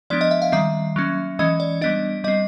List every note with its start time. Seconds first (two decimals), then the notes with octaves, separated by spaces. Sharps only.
0.10 F3 G#3 B3 D4 D5
0.21 D#5
0.31 E5
0.42 F5
0.52 D#3 G3 C4 E5
0.96 F#3 A#3 C#4
1.39 E3 G#3 C#4 D#5
1.60 D5
1.81 G3 B3 D4 D#5
2.24 G3 C4 D#5